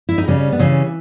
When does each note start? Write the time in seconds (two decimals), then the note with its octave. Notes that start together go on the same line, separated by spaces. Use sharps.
0.09 E4
0.18 D#4
0.28 C#3 G3 C#4
0.52 B3
0.59 C#3 E3 C#4